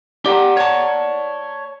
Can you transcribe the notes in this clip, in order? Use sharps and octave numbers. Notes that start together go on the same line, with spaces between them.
G4 D5 F#5 A#5
C#5 A5